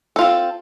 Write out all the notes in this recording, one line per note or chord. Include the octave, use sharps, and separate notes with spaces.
C4 F4 A4